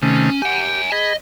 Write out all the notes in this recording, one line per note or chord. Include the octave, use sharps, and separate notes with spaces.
C3 D#3 A3 C#4
G4 F#5 G#5
G#4 D#5 B5